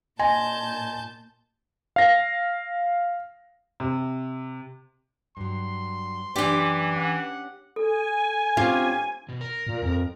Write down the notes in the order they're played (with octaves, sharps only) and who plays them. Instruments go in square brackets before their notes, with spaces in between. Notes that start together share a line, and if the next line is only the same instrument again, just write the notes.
[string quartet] A#2 A5 G6 [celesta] D#5 C6 A#6 [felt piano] G#5
[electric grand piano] F5 A#6
[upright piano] C3
[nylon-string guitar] G2 F#3 [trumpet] C6
[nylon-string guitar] F#2 D4 D5 [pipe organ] E3 [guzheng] G4 G5
[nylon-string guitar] C#4 [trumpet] F#5
[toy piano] A4 [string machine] G#5
[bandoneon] C4 C#4 G4 [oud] F4
[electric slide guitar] B2
A#4
[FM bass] A#2
F2